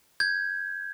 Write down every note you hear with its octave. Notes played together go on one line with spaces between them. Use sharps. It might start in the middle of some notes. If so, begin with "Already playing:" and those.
G6 G#6